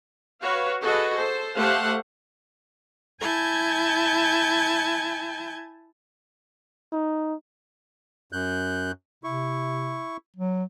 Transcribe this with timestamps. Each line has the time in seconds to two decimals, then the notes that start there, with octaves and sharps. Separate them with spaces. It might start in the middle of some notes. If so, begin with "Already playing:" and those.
0.42 F#4 B4 C#5 F5
0.82 F#4 G#4 A4 B4 D#5
1.16 A4 C5
1.56 A3 G4 C5 F5 F#5
3.20 E4 G#5 A5 G6 G#6
6.93 D#4
8.33 F#2 F#6 G6
9.24 C3 E4 C#6
10.37 F#3